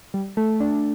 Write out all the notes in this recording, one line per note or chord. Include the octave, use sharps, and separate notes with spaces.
G3
A3
D4